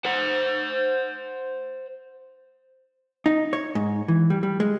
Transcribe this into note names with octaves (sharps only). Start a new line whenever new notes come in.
C5 F#5
D#4
C#5
G#2
E3
G3
G3
G#3